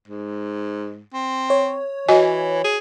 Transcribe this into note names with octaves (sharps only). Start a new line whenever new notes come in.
G#2
C4
C#5
E3 F#4 D#5 G#5
G#4